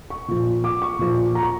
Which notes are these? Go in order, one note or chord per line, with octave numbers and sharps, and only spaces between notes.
C#6
A#2 F3
D6
C#6
A#2 F3
A#5
C#6